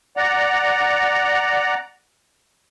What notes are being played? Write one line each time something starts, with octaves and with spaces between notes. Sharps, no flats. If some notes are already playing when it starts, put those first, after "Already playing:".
D5 F#5 A#5